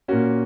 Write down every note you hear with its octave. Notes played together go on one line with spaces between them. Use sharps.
A#2 A#3 C#4 F#4